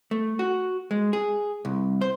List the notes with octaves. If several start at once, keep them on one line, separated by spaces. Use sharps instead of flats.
A3
F#4
G#3
G#4
C2
C5